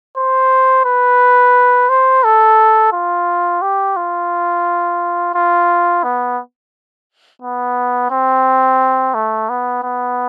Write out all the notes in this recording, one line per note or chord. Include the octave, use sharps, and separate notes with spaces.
C5
B4
C5
A4
F4
G4
F4
F4
B3
B3
C4
A3
B3
B3